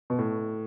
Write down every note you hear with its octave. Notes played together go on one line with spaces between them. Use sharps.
B2
A2